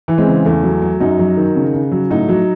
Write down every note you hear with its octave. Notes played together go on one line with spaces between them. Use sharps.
E3
G#3 C4
C#3
E2 A3
F#3
F#3
F#2 D#4 F#4
F#3
D#3
C#3
C#3
F#3
A2 D#4 F#4
F#3